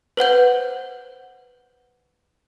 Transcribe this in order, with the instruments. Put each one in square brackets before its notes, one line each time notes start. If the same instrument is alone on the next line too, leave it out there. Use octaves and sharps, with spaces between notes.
[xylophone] B4 C5 F#5 G6